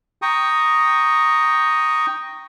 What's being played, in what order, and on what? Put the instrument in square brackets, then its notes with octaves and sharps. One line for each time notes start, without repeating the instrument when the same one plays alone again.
[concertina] G5 A#5 C#6 D#6